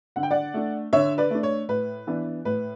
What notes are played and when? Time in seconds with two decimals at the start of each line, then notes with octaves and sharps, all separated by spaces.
0.16 D3 F#5
0.23 G5
0.31 D5 F#5
0.54 A3 D4
0.93 D3 C#5 E5
1.18 B4 D5
1.31 A3 D4
1.43 C#5
1.69 A2 B4
2.07 E3 B3 D4
2.45 A2 B4